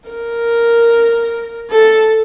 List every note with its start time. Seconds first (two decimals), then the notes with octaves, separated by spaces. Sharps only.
0.09 A#4
1.71 A4